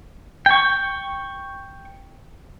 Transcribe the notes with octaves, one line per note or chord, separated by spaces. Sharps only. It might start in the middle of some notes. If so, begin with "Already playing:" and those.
G5 C#6